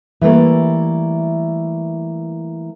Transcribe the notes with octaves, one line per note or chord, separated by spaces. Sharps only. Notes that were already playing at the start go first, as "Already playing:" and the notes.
E3 G3 A3 A#3